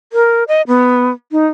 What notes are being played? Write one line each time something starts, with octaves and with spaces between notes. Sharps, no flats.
A#4
D#5
B3
D#4